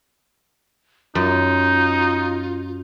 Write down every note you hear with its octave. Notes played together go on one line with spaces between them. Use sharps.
F#2 D#4 F4